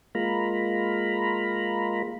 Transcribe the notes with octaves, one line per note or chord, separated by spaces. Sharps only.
G#3 A#3 F4 A#5 B5